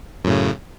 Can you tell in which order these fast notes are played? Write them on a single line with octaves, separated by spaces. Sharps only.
F#2 A2 C#3